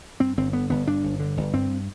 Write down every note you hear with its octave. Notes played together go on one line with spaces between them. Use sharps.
G2 C4
G1 C4
D3 B3
G1 B3
G2 D4
G1
D3
G1
G2 C4